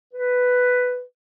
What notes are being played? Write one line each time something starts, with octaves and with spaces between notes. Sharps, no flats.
B4